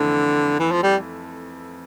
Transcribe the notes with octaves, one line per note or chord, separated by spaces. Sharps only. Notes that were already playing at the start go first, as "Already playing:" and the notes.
Already playing: F2 D3 E3 A3 C4 E4
E3
F3
G3